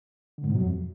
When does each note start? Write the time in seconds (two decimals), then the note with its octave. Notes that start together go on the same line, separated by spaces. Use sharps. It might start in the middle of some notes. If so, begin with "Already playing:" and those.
0.38 D3
0.44 G#2
0.49 B2
0.55 F#3
0.61 F2